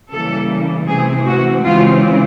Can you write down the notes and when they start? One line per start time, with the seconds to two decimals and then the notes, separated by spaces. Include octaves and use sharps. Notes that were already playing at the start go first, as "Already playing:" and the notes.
0.11 C#3 E3 G3 A#3 A4
0.87 C3 E3 A3 C4 G#4
1.26 F#4
1.65 C#3 E3 G#3 C4 F4